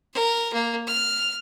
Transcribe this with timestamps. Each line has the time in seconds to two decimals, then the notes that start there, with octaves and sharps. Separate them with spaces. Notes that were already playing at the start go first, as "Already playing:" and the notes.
0.13 A#4
0.54 A#3
0.87 F6